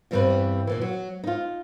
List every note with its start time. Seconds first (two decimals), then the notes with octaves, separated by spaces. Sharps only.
0.11 E2 G2 E3 G3 C4 B4
0.67 D#2 A#2 E3
0.81 F#3
1.24 D#4 F4